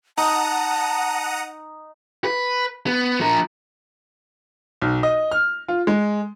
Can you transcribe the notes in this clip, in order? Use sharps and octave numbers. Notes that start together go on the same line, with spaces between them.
D#4 F#5 A5 A#5 D#6
B4
B3
F3 A#4
B1
D#5
F6
F4
G#3